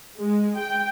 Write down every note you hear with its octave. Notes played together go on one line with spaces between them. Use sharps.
G#3
G5